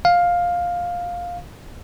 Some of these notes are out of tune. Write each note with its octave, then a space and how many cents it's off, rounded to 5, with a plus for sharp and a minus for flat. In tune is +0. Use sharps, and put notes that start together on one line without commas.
F5 +10